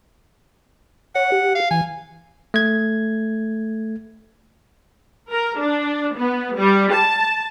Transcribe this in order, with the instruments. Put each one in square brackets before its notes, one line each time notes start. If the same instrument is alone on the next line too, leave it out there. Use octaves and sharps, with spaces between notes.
[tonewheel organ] C#5 [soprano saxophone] F#5
[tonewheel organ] G4
[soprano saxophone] F5
[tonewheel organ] E3 [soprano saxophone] G#5
[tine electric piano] A3 G#6
[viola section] A#4
D4
B3
G3
A5